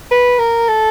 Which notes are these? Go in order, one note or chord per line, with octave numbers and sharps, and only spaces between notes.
B4
A#4
A4